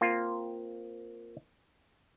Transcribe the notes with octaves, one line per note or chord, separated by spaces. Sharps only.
A#3 C4 F4